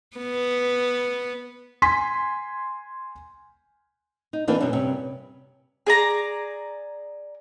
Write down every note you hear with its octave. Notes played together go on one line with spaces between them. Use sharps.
B3
G#5 C6 B6
D#4
E3 A#3 C4 D4 E4
F#2 B2 B3 C#4
G2 C3 G3 C#4
G#4 D5 A#5